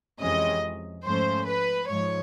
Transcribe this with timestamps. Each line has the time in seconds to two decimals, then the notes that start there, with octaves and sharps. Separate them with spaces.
0.19 F2 C3 E3 G#3 C#4 D#5
1.05 G#2 F3 A3 C#4 C5
1.47 B4
1.89 G#2 F3 C#5